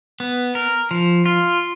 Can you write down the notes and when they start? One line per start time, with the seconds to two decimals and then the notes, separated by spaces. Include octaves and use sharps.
0.20 B3
0.55 A#4
0.91 F3
1.26 F4